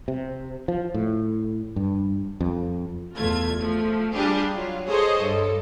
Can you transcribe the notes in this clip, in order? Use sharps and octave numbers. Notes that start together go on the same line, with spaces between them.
C3
F3
A2
G2
F2
E2 A3 F4 G#6
F3 A3
G3 D4 F4 G4 G#4
F#3 F4
G#4 A4 C5 C#5 D#5
G2 A4